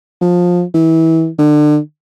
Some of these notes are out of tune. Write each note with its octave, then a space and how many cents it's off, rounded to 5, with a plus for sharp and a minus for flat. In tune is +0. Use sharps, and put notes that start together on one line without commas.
F3 +20
E3 -25
D3 +30